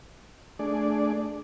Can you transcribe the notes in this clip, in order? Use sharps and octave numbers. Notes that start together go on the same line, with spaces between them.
A3 D4 G#4 D5